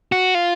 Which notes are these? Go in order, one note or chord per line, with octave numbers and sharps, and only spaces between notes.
F#4
F4